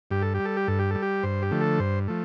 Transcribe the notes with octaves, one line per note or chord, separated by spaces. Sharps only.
G2 G4
A4
G3 G4
A4
G4
G2 A4
G4
G3 A4
G4
G2 C5
G4
D3 F3 A3
A4
G2 C5
F3 A3